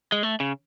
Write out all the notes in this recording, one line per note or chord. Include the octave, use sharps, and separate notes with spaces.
G#3
A3
C#3